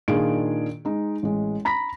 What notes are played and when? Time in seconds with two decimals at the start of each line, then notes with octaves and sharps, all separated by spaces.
0.08 A#2 D#3 D4 F4 G#4 D7
0.85 G#3 D#4
1.23 A1 G#3
1.65 A#5 B5 A#6 B6